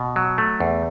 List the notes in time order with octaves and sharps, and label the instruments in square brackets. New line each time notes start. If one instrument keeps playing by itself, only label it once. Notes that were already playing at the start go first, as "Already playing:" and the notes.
Already playing: [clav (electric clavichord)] B2
F#3
A3
E2